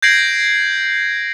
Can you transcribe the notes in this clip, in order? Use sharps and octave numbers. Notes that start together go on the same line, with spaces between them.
G6 G#6 A#6 C7 D7 F#7